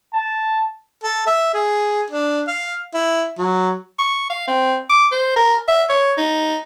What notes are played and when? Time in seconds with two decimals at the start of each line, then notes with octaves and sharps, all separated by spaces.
0.14 A5
1.03 A4
1.27 E5
1.54 G#4
2.10 D4
2.48 F5
2.94 E4
3.38 F#3
3.99 C#6
4.30 F5
4.47 C4
4.89 D6
5.12 C5
5.36 A#4
5.68 E5
5.89 C#5
6.18 D#4